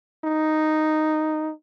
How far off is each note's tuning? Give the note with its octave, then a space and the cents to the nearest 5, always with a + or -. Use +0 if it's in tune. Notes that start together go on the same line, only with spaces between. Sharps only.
D#4 -5